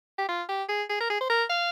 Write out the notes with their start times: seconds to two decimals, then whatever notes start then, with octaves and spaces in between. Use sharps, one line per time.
0.18 G4
0.29 F4
0.49 G4
0.69 G#4
0.90 G#4
1.01 A#4
1.10 G#4
1.21 C5
1.30 A#4
1.50 F5